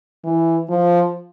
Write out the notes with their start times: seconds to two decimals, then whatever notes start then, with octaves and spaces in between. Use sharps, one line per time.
0.25 E3
0.70 F3